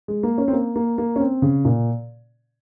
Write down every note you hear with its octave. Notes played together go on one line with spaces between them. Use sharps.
G#3
A#3
C#4
C4
A#3
A#3
A#3
C#4
C4
C#3
A#2